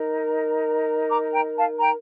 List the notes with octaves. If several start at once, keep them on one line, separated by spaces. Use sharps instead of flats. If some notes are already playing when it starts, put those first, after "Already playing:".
Already playing: D#4 A#4
A#5 D6
G5 A#5
F5 A5
G5 A#5